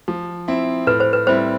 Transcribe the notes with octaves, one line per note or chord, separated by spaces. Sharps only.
F3
C4 E4
A2 B4
C5
B4
G3 C4 E4 C5